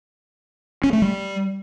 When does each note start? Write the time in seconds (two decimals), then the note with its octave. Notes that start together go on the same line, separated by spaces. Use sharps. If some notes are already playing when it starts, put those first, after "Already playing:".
0.84 C#4
0.93 A3
1.02 G3